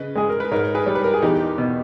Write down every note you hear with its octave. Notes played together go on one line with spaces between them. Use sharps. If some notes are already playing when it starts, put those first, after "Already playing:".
Already playing: C#3 B4 D#5
G#3 G#4
A#4
B4
G#2 A#4 C#5
G#4 B4
G3 C#5
B4
A#4
G#4
E2 D#4 G4
B2